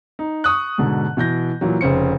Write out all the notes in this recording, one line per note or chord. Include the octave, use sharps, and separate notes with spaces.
D#4
C#6 D#6 F#6
G#2 B2 D3
B2 E3 G6 A#6
A#2 E3 F#3
F1 C#3 C5 C#7